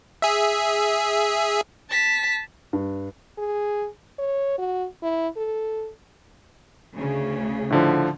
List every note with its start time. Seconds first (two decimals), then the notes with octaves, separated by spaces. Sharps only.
0.22 G#4 E5
1.90 A5 B6
2.73 G2
3.38 G#4
4.18 C#5
4.58 F#4
5.02 E4
5.37 A4
6.94 D2 C#3
7.70 A2 D3 F3